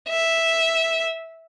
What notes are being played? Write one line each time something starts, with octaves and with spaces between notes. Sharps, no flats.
E5